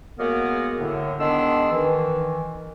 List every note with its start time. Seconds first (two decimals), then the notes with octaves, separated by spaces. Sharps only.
0.19 F#3 G#3 A#3 B3 A#4
0.79 A2 D3
1.20 D#3 G#3 B3 D4 C6 E6
1.72 D#3 E3